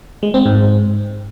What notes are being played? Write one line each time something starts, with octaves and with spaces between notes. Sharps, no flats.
G#3
C4
G#2